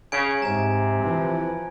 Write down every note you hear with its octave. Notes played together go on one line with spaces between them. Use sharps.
C#3 G#5 G#6 D7
G#2 C3 G#5 A#5
E3 F3